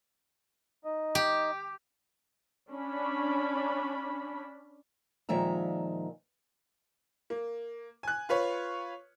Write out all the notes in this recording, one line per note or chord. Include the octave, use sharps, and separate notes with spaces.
D#4 D#5
G4
C#4 D4 B5
A#2 D#3 F3 G#3 E5 A#5
A#3
G#5 F#6
F4 B4 C#5